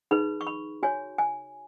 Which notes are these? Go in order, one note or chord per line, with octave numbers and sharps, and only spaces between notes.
D#4 G#4 B4 B5
C#6
B5
F#4 C#5 G#5
G#5